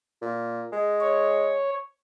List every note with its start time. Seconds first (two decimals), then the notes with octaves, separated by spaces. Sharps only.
0.22 A#2
0.72 G#3
1.01 C#5